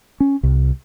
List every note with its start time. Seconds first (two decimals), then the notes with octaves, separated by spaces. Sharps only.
0.20 C#4
0.43 C2